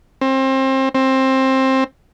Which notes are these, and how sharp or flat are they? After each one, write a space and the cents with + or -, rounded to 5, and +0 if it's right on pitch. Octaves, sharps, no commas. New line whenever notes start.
C4 +30
C4 +20